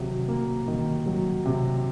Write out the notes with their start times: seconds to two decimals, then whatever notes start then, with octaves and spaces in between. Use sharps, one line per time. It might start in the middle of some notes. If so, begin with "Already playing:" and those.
Already playing: C3 D#3 F#3
0.28 A#3
0.68 D#3
1.06 F#3
1.45 C3